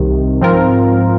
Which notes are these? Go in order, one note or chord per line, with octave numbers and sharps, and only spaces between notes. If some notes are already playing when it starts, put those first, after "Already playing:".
Already playing: C2 C3 D#3
G#2 F3 C4 F4 A#4